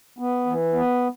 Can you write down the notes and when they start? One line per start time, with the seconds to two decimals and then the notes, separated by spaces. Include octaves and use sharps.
0.18 B3
0.46 E3
0.73 B3